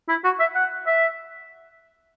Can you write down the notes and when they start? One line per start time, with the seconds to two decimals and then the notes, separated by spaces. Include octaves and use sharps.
0.09 E4
0.24 F#4
0.40 E5
0.55 F#5
0.87 E5